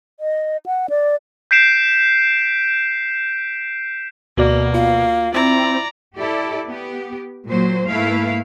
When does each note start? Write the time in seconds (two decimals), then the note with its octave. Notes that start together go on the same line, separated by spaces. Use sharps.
0.20 D#5
0.66 F#5
0.90 D5
1.51 G6 B6 C7 D7 E7
4.37 D2 B2 A#3 F#4 D5
4.74 F4 F5
5.34 C4 E4 D5 A#5
6.16 E4 G4 A4 D5
6.66 B3 G4
7.48 A#2 F#3 C5
7.89 G#2 A3 A#3 E4 B4 F5